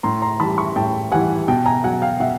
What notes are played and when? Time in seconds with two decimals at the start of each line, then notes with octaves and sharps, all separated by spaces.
0.03 A2 A#5 C6
0.22 A#5 C6
0.40 E3 G3 A5 B5
0.58 B5 C#6
0.76 A2 G5 A5
1.12 E3 G3 F#5 G#5
1.48 B2 G5 A5
1.66 G#5 A#5
1.84 F#3 F#5 G#5
2.02 F5 G5
2.20 B2 E5 F#5